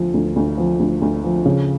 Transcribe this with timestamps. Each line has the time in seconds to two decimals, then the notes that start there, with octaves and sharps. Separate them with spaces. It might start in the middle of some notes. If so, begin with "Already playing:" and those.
Already playing: D2 F3
0.14 D2
0.36 D2
0.57 F3
0.80 D2
1.02 D2
1.24 F3
1.46 C#3